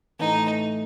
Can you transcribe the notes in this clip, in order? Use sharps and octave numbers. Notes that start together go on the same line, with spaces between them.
A2 E3 A3 D#4